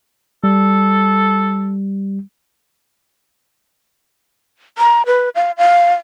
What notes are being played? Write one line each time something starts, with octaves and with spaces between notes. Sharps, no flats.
G3 A4
A#5
B4
F5
F5